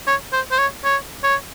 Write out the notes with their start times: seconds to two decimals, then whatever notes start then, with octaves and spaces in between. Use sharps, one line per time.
0.07 C#5
0.32 C5
0.51 C5
0.58 C#5
0.84 C#5
1.24 C#5